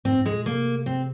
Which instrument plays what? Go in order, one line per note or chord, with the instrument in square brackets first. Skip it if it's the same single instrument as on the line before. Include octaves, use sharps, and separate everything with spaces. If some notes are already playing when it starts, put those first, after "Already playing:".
[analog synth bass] G#2 [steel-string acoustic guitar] C4
[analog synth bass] G#2
[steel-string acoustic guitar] G#3
[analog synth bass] A#2
[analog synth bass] C3 [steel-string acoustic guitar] A#3
[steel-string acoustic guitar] C4